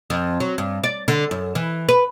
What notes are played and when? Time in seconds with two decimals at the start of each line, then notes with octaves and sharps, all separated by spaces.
0.10 F2
0.40 F#3
0.58 G2
0.84 D5
1.08 D3
1.31 F#2
1.55 E3
1.89 B4